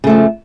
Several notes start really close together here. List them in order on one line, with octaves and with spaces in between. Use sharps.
C#3 A3 F3